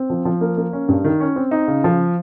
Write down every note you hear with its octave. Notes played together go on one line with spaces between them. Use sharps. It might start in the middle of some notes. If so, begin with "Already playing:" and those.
Already playing: C4
F3
F3
A#3
A#3
C#4
G2
D#3
C#4
C4
D#4
C#3
F3